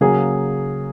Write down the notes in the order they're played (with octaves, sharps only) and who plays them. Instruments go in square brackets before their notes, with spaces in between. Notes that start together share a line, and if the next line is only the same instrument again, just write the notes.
[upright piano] C#3 F#3 A#3 G#4